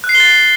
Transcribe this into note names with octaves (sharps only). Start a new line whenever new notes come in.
F#6
C7
G7
A6